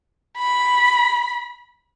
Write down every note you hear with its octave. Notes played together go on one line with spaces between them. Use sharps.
B5